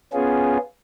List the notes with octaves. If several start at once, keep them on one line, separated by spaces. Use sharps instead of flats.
B3 C#4 F4 G#4